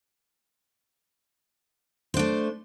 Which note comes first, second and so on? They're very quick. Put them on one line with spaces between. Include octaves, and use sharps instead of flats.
C5 D4 A3